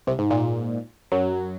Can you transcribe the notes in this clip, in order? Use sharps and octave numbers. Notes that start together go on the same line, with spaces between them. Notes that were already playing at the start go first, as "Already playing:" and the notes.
C2 C3
G#2
A#2
F#2 F#3